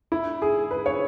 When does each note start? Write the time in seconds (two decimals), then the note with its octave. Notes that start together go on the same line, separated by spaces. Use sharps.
0.12 E4
0.42 G#4
0.71 B4
0.86 C#5